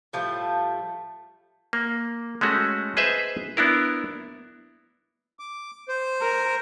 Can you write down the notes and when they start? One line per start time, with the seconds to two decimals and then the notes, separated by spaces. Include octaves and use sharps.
0.13 A2 F3 G3 A3
1.73 A#3
2.41 G#3 A3 C#4 F#4
2.97 G#4 B4 C5 D#5 E5
3.57 B3 D4 E4 A#4
5.39 D6
5.88 C5
6.22 A#4